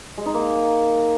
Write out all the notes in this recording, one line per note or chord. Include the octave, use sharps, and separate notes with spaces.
G#3
D#4
A#3